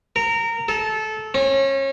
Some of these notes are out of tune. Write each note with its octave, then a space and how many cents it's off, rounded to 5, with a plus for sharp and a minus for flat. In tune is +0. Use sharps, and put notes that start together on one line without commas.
A#4 -20
A4 -20
C#4 -30